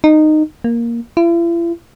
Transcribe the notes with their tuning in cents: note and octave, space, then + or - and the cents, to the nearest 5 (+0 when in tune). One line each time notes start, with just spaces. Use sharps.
D#4 -15
A#3 +5
E4 +45